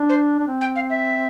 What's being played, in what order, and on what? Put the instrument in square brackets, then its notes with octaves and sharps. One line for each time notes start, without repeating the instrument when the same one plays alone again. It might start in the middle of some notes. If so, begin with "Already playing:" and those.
Already playing: [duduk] D4
[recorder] C5
[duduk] D4
C4
[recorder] G5
F5
E5